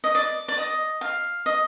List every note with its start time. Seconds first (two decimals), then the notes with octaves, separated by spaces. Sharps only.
0.04 D#5
0.15 D5
0.48 D5
0.58 D#5
1.01 F5
1.46 D#5